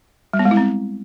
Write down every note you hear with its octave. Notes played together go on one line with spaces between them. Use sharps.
G3
B3
G#3
E4
C4